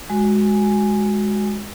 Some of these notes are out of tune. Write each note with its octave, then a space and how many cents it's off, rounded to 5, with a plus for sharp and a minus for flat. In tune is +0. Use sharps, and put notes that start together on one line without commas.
G#3 +0 F#4 +0 G#5 +0